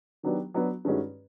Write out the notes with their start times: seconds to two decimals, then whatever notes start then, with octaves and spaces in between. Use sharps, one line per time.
0.23 D#3 F#3 B3 D4 G4
0.54 F#3 B3 D4 F#4
0.85 G2 D#3 G#3 C#4 F#4